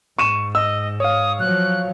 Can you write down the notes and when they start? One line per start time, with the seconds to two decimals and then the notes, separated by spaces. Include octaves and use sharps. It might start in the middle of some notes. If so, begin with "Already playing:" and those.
0.19 G#2 C#6 D#7 E7
0.55 D#5 E6
1.00 C#5 F5 D#6
1.40 F3 F#3 F#6